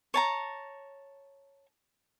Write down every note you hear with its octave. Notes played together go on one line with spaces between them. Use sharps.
C#5 A5 A#5